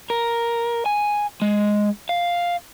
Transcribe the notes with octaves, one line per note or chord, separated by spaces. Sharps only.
A#4
G#5
G#3
F5